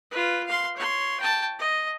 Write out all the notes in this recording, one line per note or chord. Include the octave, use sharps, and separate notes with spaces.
F4 B4
F5 C6
C#5 C6
G5 A5
D#5